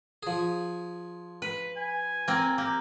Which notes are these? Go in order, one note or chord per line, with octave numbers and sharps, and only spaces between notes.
F3 G#4
B4
G#5
A#3 C4
A#3 G4